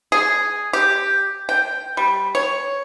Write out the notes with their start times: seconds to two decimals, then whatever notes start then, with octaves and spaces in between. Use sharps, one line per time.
0.12 G#4
0.73 G4
1.49 G5
1.97 G3
2.35 C#5